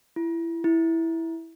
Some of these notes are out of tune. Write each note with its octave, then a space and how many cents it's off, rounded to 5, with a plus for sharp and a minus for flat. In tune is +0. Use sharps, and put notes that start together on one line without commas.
E4 +20
E4 -5